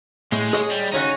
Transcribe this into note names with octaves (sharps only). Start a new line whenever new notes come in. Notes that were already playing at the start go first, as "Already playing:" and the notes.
A2 G#3
G#4 C#5 D#5
G3
C#3 C#4 D#4 F#4